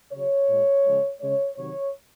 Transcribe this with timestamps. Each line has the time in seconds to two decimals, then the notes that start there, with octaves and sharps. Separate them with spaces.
0.12 C#3 F#3 C#5
0.48 A#2 G#3
0.85 C#3 F3 G#3
1.21 C#3 G#3 C#5
1.57 C3 D#3 F#3 C#5